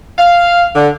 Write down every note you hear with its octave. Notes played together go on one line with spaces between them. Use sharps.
F5
D3